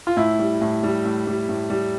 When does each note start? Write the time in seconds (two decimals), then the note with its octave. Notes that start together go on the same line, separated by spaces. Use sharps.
0.07 F4
0.17 A2 E4
0.39 G3
0.61 A2
0.84 G3
1.05 A2
1.27 G3
1.49 A2
1.70 G3